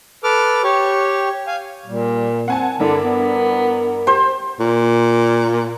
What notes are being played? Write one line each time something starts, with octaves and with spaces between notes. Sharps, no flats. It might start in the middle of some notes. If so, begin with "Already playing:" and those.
A4 B4 D6 F6
G4 C#5 C#6
F5 G#5
A#2 G3
C4 F#5 G#5 A5
G2 D3 D4 E4 A#4
B3
G4 C5
A#2